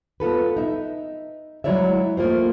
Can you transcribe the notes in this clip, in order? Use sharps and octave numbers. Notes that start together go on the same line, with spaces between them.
B3 F4 A4 B4
D#4 E5
F#3 G#3 E4 C#5 D5 E5
A3 A#3 F4 C5